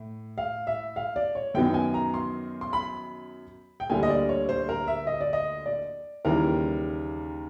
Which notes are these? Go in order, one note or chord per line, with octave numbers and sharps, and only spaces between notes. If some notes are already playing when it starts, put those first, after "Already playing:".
Already playing: A2
F5
E5
F5
D5
C#5
F#2 D#3 F#3 B3 G5
G#5
A#5
C6
C6
B5
G5
D2 D3 G3 A#3 G#5
D#5
D5
C#5
C5
A#4
E5
D#5
D5
D#5
D5
D#2 C#3 E3 G3 A#4